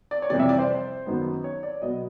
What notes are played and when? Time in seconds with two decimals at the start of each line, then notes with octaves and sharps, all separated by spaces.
0.11 D5
0.22 C#5
0.30 F2 C3 E3 G3 D5
0.40 E5
0.49 D5
0.59 C5
1.06 F#2 D#3 F#3 B3
1.44 C#5
1.63 D5
1.82 B2 F#3 B3 D#5